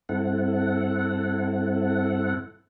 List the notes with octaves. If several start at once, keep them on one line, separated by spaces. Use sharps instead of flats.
G2 C4 E4 A4 F#5